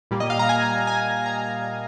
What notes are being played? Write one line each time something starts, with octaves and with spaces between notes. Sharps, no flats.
A#2 G3 A#3
D#5
F5
A#5
G#5
G#5
A#5